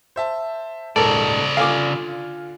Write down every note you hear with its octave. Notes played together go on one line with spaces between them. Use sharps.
C5 E5 A5
D#1 G#2 C#3 A4 A#4 D5
D3 F4 F5 G#5 D6